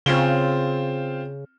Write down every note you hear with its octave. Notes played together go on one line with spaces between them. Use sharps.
C#3 C4 F4 G7